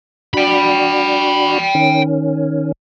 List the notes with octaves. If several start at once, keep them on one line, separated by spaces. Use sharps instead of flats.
D4 F#4 G5 B5
D#3 C#4